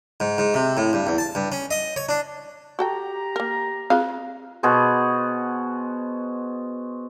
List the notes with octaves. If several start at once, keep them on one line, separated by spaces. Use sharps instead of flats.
G#2
G#2
C3
A2
G2
E2
A5
G2
C#4
D#5
C#5
D4
F#4 G4 A4 G5 A#5
A#3 A#4
C4 F4 G#4 B4 C5 F5
B2 F#4 G#4 C5